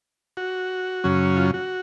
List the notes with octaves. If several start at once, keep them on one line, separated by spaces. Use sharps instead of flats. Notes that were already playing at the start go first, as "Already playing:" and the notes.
F#4
F#2 C#3 F#3 C#4
F4
F#4